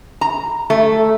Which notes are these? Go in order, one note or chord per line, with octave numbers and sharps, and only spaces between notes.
A#5
A3